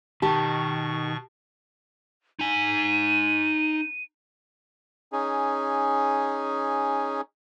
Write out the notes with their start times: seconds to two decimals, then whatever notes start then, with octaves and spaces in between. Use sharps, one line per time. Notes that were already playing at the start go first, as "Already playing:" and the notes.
0.22 B2 D#3 G4 A5 C#6
2.39 D#4 G#5 D#7
5.13 C#4 D#4 G#4